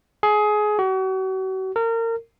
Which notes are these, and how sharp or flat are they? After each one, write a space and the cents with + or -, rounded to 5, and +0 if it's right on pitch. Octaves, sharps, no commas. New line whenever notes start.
G#4 +20
F#4 +40
A#4 -30